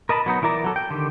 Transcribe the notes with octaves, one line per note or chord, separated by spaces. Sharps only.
A#4 D#5 A5 B5
F#3 B3 D#4
E3 E4 A#4 D5 A#5
F#3 A4
G5
D3 D#3 G4